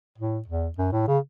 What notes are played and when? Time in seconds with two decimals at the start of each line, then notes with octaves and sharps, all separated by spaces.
0.18 A2
0.48 E2
0.78 F#2
0.92 A2
1.08 C#3